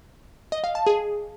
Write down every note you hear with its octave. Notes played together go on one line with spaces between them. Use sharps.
D#5
F5
A5
G#4